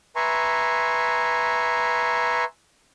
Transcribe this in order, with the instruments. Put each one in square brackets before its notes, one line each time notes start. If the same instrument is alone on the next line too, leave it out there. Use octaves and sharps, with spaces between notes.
[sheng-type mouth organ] B4 E5 G#5 A#5 C6 C#6